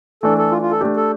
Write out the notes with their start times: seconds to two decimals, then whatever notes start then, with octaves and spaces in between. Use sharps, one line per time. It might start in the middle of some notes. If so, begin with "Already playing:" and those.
0.23 E3 A3 D4 A4
0.38 A4
0.51 F4
0.62 F4
0.72 A4
0.81 A3 D4 G4
0.96 A4